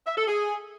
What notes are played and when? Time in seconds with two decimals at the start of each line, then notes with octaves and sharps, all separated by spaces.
0.06 E5
0.17 A4
0.27 G#4